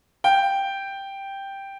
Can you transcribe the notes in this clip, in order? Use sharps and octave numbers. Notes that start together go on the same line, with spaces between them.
G5